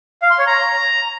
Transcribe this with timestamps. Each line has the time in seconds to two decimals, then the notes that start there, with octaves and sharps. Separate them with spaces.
0.22 F5
0.30 C6
0.39 C#5
0.47 A#5